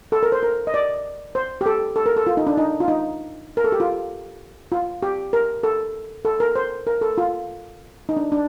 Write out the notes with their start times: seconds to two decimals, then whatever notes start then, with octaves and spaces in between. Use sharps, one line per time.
0.12 A4
0.23 A#4
0.32 C5
0.43 A#4
0.67 D#5
0.74 D5
1.35 C5
1.61 G4
1.66 A4
1.96 A4
2.06 A#4
2.17 A4
2.27 F4
2.37 D#4
2.47 D4
2.57 D#4
2.80 F4
2.88 D#4
3.57 A#4
3.64 A4
3.72 G4
3.80 F4
4.72 F4
5.03 G4
5.33 A#4
5.63 A4
6.25 A4
6.40 A#4
6.55 C5
6.87 A#4
7.01 A4
7.18 F4
8.09 D#4
8.17 D4
8.32 D4